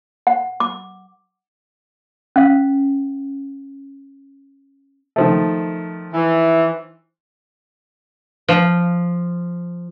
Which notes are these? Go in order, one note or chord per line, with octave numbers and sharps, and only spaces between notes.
F#5
D6
C#4 F5
D#3 F3 A3
E3
F3